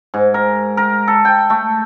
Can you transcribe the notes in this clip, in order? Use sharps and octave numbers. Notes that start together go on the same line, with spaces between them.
G#2
A#4
A#4
A4
G5
A3